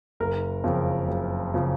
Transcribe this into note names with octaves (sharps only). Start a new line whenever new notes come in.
F#1 A#4
F2 C#3 F3
F#1
C#3 F3